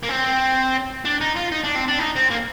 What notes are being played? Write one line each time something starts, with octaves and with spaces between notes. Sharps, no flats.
A#3
C4
D4
D#4
F4
D#4
D4
C4
D4
D#4
C4
A#3